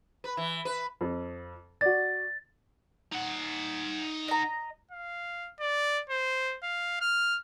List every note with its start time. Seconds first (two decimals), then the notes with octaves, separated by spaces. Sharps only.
0.24 B4
0.37 E3
0.65 B4
1.01 F2
1.81 F#4 D5 A6
3.12 D#4 F#5
4.28 D#5 A#5
4.91 F5
5.60 D5
6.09 C5
6.63 F5
7.01 F6